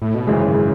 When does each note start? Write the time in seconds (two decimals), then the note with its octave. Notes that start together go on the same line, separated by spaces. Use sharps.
0.02 A2
0.15 B2
0.27 G#1 F#2 C#3 E3 G#3